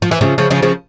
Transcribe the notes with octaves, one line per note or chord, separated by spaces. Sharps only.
F3
E3
C#3 F3
C#3 F3
C#3 F3
C#3 F3